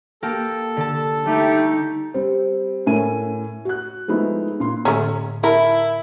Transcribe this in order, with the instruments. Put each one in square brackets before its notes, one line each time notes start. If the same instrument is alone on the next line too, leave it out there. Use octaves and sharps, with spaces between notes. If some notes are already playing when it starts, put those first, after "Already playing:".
[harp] A#3 G4 A#4 [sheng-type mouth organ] A4
[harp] D3 A5
[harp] G3 [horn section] A3 G4 [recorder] D#4
[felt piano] G3 C4
A2 A3 C#4 A#4 G#5 D#7
F#4 F#6
F3 G#3 A3 B3 D#4 E4
A#2 C6
[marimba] A2 D3 A#5 [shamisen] A3 C#4
[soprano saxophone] E4 [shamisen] A#4 [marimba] A5